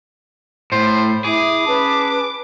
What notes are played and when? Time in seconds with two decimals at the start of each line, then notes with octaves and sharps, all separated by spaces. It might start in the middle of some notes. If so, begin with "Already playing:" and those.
0.72 A2 C5
1.24 E4 G#4 D6
1.67 C#4 B4 A5